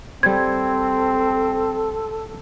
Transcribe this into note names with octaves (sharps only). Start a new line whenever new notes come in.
G3 C4 A4 C5 G#6